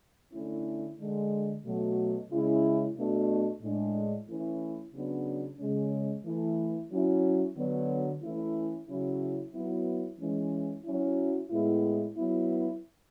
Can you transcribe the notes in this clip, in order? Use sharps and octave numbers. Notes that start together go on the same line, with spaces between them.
D3 A3 C#4 E4
D3 G#3 D4
B2 F#3 A3
C#3 G#3 C#4 E4
B2 A3 D4
A2 G#3 D4
E3 A3 C#4 E4
C#3 F#3 B3 D4
C#3 G#3 C#4
E3 A3 E4
F#3 C#4 E4
D3 F#3 B3
E3 A3 C#4 E4
C#3 F#3 C#4 E4
F#3 B3 E4
E3 G#3 C#4
F#3 C#4 E4
A2 G#3 B3 E4
F#3 B3 E4